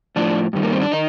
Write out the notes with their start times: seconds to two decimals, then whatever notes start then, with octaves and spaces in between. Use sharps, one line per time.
0.16 A2 F3 D4
0.53 G2 D#3 G3
0.63 A#3
0.72 C4
0.82 D4
0.92 D#3 D#4